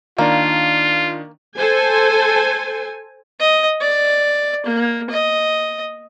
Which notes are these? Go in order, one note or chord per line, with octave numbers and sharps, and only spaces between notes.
D#3 A#3 D4 F4 D5
A4 C5 G#5
D#5
D5
A#3
D#5